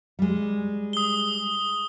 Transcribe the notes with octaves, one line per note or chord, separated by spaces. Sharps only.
G3 G#3
D#6 G7